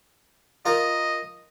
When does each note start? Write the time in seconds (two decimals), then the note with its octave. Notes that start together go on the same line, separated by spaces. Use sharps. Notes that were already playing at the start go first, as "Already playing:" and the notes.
0.66 F4 A#4 D#5